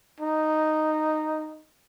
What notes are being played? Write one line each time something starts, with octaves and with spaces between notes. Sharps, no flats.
D#4